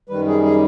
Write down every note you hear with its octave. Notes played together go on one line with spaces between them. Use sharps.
F#2 D#3 G3 B4
G#4
G#4